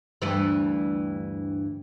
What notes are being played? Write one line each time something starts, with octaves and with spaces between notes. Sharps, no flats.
D2 G2 E3